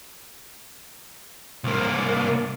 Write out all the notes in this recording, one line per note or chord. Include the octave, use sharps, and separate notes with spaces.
C2 A#3